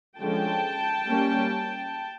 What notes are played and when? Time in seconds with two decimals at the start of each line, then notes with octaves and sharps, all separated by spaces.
0.19 D3 F3 G#3 C#4 G5 A5
1.07 G3 A#3 C#4